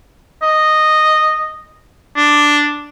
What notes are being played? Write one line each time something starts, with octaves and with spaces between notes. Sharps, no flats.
D#5
D4